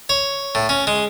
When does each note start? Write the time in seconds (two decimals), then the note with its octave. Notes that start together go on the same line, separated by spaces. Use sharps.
0.09 C#5
0.55 A2
0.69 C#4
0.87 G#3